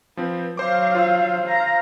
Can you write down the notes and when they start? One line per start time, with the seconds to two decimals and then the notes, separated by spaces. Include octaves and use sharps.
0.17 F3 C4 B4
0.57 F#3 C5 F5 D6
0.95 F4 C5 E6
1.48 F5 A#5